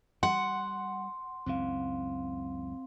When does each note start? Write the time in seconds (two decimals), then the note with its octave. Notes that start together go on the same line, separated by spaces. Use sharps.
0.23 G3 F#5 C6
1.46 C#2 F#2 E3 C4 F5